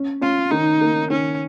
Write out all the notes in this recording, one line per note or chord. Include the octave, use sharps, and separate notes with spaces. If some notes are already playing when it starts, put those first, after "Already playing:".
Already playing: C#4
C#4 F4
D#3 D#4
A#3
D#3 C#4